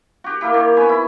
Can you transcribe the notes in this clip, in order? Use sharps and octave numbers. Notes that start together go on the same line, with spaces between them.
F#4 G4
A#3 E4 G4
D#3
B3 F#4 G#5 B5
E4